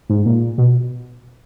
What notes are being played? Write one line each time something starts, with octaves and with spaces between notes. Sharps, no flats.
G#2
A#2
B2